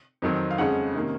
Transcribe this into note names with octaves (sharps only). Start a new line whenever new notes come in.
F2 D#3 F#3 C4
F5
F2 C#3 G#3 C#4 F#5
C3 D#3 A#3 C#4